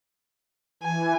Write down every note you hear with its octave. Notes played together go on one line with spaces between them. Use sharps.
E3 G#5